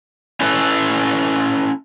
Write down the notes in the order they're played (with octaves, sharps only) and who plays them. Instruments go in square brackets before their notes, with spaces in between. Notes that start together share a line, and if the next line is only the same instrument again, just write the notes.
[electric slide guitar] C#4 E4 A4 B4